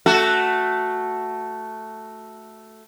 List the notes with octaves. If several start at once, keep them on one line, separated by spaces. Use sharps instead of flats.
A3 F#4 A4